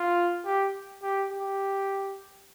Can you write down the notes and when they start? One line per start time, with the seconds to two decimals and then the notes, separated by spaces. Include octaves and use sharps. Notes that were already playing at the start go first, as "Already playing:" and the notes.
Already playing: F4
0.46 G4
1.03 G4
1.31 G4